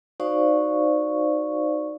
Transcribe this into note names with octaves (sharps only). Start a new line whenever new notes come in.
D#4 F#4 C5 D5 F5 C#6